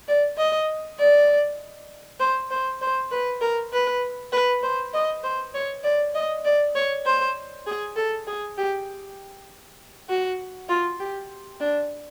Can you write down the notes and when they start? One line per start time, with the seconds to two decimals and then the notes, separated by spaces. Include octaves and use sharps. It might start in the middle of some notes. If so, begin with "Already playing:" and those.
0.08 D5
0.38 D#5
0.99 D5
2.20 C5
2.51 C5
2.82 C5
3.11 B4
3.42 A#4
3.73 B4
4.33 B4
4.63 C5
4.94 D#5
5.24 C5
5.55 C#5
5.84 D5
6.15 D#5
6.45 D5
6.76 C#5
7.06 C5
7.67 G#4
7.97 A4
8.27 G#4
8.58 G4
10.09 F#4
10.69 F4
11.00 G4
11.60 D4